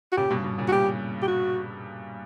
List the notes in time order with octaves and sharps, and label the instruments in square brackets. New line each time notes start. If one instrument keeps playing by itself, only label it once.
[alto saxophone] F#4
[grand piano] A#2 C#3 [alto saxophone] G4
[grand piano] G2 B2
G2 B2
A#2 C#3
[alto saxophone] F#4
[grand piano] G2 [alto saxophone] G4
[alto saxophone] G4
F#4